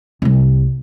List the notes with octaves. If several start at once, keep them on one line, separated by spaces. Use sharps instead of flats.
C2 G3